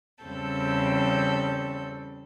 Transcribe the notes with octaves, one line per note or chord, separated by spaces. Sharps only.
E2 C#3 G3 C4 A4 G6